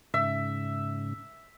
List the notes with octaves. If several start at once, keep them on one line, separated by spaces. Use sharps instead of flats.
G#2 C#3 E5